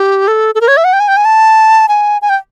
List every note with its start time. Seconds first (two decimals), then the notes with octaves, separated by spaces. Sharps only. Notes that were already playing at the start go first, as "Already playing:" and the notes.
Already playing: G4
0.28 A4
0.55 A4
0.61 A#4
0.68 C#5
0.77 E5
0.84 F#5
0.93 G5
1.00 G#5
1.08 G5
1.17 G#5
1.25 A5
1.88 G#5
2.22 G#5
2.29 G5